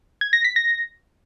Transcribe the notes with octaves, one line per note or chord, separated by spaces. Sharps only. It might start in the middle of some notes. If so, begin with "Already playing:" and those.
G#6
A#6
B6
A#6